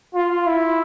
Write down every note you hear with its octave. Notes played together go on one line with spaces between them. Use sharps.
F4
E4